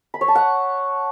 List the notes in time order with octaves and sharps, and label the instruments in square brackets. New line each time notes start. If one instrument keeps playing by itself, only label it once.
[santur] B5
C#5
A5
F#5